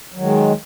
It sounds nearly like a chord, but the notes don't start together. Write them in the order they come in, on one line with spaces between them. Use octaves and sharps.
F#3 D#3 G#3